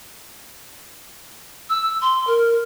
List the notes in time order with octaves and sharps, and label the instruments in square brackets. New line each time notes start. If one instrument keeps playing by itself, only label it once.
[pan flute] E6
C6
A#4